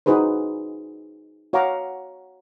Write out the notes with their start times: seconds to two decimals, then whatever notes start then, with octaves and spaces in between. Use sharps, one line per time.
0.06 D#4 F#4 G#4 B4 C5
1.53 F#4 C#5 F5 F#5 A#5 D6